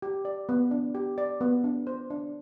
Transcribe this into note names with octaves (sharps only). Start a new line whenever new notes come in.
G4
D5
B3
D4
G4
D5
B3
D4
C5
D4